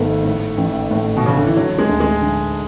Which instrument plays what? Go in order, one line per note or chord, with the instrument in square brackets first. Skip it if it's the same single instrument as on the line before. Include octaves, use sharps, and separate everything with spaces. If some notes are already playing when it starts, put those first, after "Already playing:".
Already playing: [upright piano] G#1 G#2 B3 [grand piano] A3
[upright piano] A2
A1
A2
[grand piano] B2
[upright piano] A1 [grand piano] C#3
[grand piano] D3
E3
[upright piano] D3 [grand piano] F#3
[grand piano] G#3
[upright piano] D2
[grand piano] G#3
[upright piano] D3